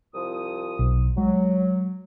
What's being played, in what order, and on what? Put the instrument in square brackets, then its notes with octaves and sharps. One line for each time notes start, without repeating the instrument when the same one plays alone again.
[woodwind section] C2 F3 D#6
[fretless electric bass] B1
[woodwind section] F#3 [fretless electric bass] G#3